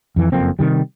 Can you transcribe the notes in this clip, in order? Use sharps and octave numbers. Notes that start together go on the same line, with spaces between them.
F2 E3
F#1 F2 A#3 C4
C3 D#3 G3